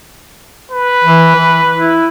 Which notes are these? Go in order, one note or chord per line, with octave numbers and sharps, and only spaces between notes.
B4
E3
E3
E4